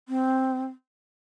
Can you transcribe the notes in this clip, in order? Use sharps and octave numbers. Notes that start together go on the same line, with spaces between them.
C4